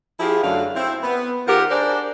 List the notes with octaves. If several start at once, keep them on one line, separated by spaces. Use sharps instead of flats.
F3 E4 F4 G4 G#4
F#2 D3 F#3 A3 D4 F5
C4 E4
B3
D#3 F4 G4 A#4 C5 F#5
D4 G#4 A#4 C5 D5